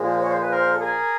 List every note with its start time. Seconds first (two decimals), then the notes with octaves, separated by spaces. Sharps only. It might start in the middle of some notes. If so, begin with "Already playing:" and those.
Already playing: A#2 F3 G#3
0.20 C#5
0.31 C5
0.42 B4
0.52 A#4 C5
0.73 A4
0.81 G#4 A#4